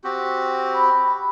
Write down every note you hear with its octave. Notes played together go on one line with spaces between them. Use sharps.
C4 F#4 G4
B5